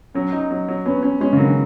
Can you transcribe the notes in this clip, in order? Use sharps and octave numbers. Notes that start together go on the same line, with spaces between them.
F#3 C#4
D#4
F#3
F#3
B3 C#4
B3 C#4
G#3 C#4
C#3
D#3 F#3